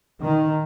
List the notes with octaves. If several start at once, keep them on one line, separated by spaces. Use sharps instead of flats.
D#3